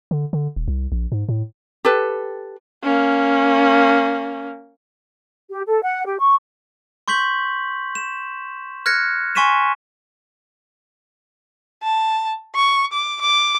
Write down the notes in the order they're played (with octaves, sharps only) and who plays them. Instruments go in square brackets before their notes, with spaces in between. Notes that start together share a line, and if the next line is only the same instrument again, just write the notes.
[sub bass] D3
D3
D#1
C2
A#1
G#2
A2
[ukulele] G4 A4 B4
[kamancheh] A#3 C#4
[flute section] G4
A4
F#5
G4
C#6
[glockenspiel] C6 C#6 G6 B6 F#7
E7
F6 F#6 G#6 A#6 C#7
G#5 C6 C#6 B6 D#7 E7
[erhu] A5
C#6
D6
D6